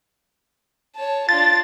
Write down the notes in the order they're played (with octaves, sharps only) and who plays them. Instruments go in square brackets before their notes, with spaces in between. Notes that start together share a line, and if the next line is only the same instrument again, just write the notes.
[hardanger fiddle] C#5 A5
[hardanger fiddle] D4 F4 [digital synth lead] A6